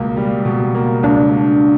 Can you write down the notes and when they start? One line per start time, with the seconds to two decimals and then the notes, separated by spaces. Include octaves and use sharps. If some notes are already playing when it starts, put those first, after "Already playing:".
Already playing: C#2 B2 A#3
0.17 G3
0.45 B2
0.75 A#3
1.03 C#2 D4